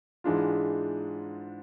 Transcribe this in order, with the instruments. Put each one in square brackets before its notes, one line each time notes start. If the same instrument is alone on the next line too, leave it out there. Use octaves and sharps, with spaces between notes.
[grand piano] G#2 E3 G#3 D4 F4